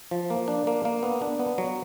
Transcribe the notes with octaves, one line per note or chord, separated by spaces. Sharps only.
F3
A#3
D4
A#3
A#3
B3
D4
B3
F#3